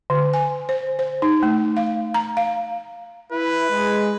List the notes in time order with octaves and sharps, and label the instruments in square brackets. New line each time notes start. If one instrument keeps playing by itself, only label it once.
[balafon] D3
G#5
C5
C5
D#4
A3
F5
A#5
F5
[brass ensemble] E4 [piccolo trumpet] B4
[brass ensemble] G#3